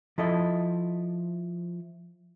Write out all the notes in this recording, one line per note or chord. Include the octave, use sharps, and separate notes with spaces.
F3 E4 A4 D#5